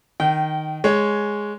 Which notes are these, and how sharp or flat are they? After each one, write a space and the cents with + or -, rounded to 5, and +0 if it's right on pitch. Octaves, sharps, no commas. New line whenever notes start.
D#3 -5 G5 -35
G#3 +0 C#5 +0